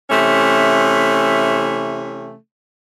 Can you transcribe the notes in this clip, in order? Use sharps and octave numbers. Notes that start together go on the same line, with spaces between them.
C3 E3 A3 C#4